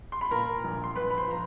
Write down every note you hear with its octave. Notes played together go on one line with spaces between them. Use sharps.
C6
B5
A#2 A#4 A#5
A#1
C6
A#1 B4 B5
B5
C5 C6
F3 A#5